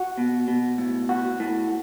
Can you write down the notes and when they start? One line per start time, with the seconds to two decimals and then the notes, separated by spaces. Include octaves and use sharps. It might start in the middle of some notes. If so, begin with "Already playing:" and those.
Already playing: F#4
0.18 B2
0.48 B2
0.78 A2
1.09 F#4
1.40 A2